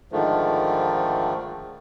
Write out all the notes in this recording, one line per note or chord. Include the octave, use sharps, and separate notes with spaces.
G#2 D3 D#3 F3 A3